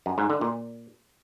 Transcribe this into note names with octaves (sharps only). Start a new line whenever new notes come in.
F#2
G#2
D3
A#2